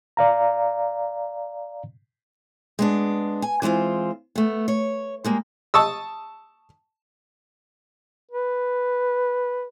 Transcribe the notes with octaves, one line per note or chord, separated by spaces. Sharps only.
D5 F5 A#5
G#3 B3 D4
G#5
E3 G#3 C4 F4 C5
A3 B3
C#5
G3 G#3 A#3
A5 C#6 D#6 E6
B4